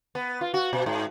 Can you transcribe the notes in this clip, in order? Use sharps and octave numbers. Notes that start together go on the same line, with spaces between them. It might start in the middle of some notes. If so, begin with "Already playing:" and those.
B3
F4
F#4
B2
G#2